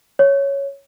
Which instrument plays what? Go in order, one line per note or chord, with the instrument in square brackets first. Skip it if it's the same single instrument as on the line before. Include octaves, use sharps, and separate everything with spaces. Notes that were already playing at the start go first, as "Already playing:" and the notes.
[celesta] C#5